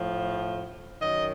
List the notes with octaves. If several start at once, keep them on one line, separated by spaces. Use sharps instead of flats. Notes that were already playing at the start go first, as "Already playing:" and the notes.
Already playing: A2 F3
F#2 D#3 F#3 D#5